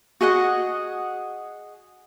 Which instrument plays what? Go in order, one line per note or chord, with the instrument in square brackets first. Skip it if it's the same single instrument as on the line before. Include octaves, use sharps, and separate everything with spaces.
[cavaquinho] F#4 G#4 D#5 F#5